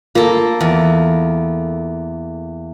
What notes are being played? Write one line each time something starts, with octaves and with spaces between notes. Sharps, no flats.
A#3 F4 A4 A#4
E2